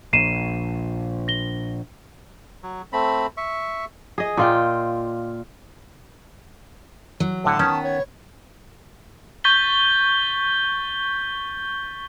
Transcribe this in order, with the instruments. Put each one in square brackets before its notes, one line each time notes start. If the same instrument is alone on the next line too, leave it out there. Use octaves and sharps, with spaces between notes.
[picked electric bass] A#1 [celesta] C7 D#7 E7
[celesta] A#6 G7
[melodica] F#3
A3 C4 B5
E5 C#6
[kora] G#4 D#5
A#2 F4 G5
[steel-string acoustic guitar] F#3
[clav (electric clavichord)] A2 D3 F#5 [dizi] A5
[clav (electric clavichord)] D#3 C#4 [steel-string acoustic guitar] B3
[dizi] C#5
[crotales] C#6 G6 A6 B6 G7